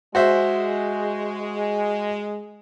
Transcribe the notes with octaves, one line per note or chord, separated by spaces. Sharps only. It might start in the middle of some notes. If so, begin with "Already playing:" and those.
G#3 F#4 C5 E5